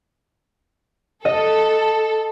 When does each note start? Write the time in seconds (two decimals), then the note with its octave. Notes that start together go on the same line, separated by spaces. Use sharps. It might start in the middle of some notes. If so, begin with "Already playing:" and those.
1.25 A4 D#5